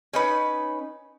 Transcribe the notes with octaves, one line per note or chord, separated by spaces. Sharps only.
C#4 D#4 B4